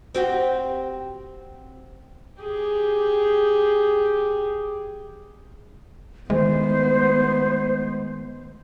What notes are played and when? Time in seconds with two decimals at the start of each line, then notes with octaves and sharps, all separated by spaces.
0.15 C4 F#4 G4
2.42 G4 G#4
6.30 D#3 G#3 A3 B3 C5